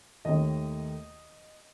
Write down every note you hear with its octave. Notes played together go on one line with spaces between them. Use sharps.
D#2 D#3 A3 D#5